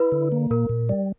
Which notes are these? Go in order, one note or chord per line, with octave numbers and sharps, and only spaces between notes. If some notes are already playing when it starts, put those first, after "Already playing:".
Already playing: E4 B4
D3
A#3
A#2 A#4
A#2
G3